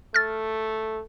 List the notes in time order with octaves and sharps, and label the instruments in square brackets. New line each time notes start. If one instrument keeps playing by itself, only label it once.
[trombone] A3 [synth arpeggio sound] F6 A6